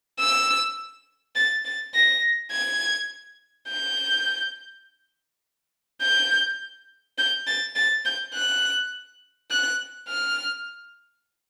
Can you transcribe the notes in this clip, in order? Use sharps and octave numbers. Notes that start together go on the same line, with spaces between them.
E6
A6
A6
A#6
G#6
G6
G6
G6
A6
A6
G6
F#6
F#6
F6